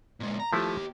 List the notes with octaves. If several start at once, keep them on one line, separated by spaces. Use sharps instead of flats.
A#2 G#3
A#5
D#2 F3 A3 E4 G4